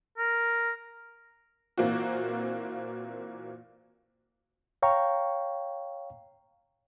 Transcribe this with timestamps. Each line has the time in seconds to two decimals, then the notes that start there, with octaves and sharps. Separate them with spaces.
0.18 A#4
1.78 A#2 E3 A#3 C4 F4 F#4
4.82 C#5 F5 G5 A#5 C#6